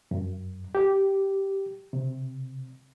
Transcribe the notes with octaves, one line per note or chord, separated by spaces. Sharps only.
F#2
G4
C3